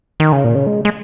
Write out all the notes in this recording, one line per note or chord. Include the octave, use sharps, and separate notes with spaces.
D#3
C#3
A#2
C#3
G#3
G#3